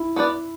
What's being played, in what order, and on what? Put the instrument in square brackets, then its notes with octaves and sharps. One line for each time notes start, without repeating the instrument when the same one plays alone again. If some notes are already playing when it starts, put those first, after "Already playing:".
Already playing: [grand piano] E4
[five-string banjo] B3 F#4 B4 D5